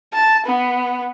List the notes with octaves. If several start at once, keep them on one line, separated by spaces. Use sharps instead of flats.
A5
B3